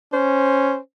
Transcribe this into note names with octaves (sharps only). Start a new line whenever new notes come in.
C#4 C5